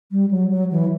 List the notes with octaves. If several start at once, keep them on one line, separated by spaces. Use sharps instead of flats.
G3
F#3
F#3
E3